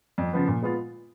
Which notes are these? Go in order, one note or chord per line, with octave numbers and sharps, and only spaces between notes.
F2
C#3 F3 B3
A#2
G#3 B3 F4